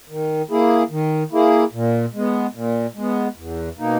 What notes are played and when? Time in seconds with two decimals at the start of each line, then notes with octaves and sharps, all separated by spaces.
0.09 D#3
0.50 A#3 E4 G#4
0.90 D#3
1.31 A#3 E4 G#4
1.73 A#2
2.14 G#3 B3
2.54 A#2
2.95 G#3 B3
3.36 E2
3.78 B2 A#3 D#4